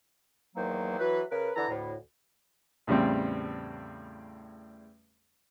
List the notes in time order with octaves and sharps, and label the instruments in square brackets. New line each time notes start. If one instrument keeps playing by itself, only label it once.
[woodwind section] E2 D#3 F#3 A#3 C5
E3 F#3 B4
C#3 A#4 B4
D3 E3 A4 A#5
D2 A2
[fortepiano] E2 A2 C#3 G3 C4